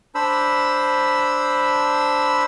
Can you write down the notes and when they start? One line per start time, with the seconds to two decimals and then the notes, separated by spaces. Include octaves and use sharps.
0.15 D4 C5 B5 E6